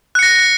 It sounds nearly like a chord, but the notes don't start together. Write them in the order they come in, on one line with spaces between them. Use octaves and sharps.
F#6 C#7 A#6